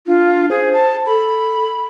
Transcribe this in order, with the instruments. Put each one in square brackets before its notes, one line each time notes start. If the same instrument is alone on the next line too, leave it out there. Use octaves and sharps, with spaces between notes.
[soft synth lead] D4 [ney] F4
[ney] G#4 [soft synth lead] C5
[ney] A5
[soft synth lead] A4 [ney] B5